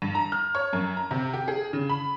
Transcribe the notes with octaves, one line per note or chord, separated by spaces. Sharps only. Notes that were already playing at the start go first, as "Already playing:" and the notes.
G2
A#5
F6
C#5
F#2
A#5
C3
G4
G#4
C#3
B5